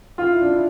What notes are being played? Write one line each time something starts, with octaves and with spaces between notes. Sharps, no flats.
F4
E4
D4
E4